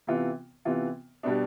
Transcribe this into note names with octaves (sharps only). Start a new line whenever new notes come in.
C3 E3 B3 F4
C3 E3 B3 F4
B2 G3 B3 D4